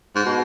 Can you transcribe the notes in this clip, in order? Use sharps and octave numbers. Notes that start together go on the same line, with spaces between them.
G#2
B2